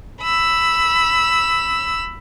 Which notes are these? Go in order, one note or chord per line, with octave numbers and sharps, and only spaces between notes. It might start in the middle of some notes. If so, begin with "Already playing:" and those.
B5 E6